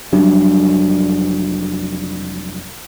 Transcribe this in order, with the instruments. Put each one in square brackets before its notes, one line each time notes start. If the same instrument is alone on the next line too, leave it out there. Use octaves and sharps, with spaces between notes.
[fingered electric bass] F1 F#3 G3 D4